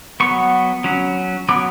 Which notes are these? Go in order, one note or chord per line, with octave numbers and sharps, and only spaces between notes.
F#3 B3 C#6
F#3 C#4
F#3 B3 D6